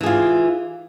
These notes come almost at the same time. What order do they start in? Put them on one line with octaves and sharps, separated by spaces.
E3 G#4 F4 G4